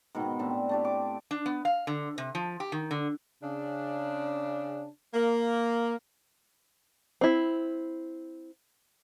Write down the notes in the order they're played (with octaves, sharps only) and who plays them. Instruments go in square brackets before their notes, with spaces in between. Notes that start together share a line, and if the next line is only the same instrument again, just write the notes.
[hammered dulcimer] G#2 B2 D#3
A2 C4 D4 E5
A3 D4 G4
D6
[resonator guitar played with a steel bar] D4
B3
F5
D3
C3
F3
G4
D#3
D3
[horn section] C#3 D4
A#3
[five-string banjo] C4 E4